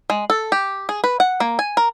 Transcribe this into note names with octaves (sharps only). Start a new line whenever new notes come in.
G#3
A4
G4
G#4
B4
F#5
A#3
G#5
A#4